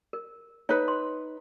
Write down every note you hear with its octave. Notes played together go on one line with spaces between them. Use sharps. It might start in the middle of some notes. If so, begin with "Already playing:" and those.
A#4
D#4 B4 C#5
C6